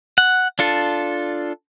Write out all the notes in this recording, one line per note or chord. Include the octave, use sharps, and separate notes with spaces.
F#5
D4 F4 A4